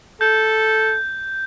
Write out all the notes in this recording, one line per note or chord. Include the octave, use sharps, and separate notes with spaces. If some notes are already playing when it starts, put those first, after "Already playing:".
A4 G6